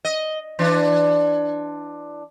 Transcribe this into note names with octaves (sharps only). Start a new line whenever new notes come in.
D#5
E3 D4